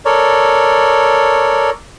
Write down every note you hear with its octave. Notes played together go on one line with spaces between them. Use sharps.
A4 A#4 C#5 D5